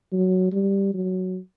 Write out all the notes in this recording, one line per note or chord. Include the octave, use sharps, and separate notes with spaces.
F#3
G3
F#3